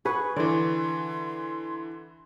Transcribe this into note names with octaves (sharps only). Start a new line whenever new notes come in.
G#4 B4 F#5 C#6
D3 E3 D5 C6